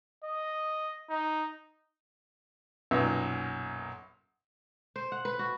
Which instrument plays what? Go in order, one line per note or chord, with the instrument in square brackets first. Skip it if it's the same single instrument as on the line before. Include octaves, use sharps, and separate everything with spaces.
[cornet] D#5
D#4
[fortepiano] B1 F#2 A#2
[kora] C5
F#5
B4
F#4